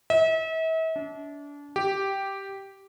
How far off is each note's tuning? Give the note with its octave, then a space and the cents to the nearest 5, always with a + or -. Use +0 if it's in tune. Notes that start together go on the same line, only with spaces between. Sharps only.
E5 -40
D4 -30
G4 -5